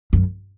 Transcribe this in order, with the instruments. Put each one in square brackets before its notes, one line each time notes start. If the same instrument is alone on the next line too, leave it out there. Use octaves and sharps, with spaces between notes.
[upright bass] F#2